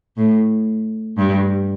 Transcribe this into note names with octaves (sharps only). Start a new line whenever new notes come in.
A2
G2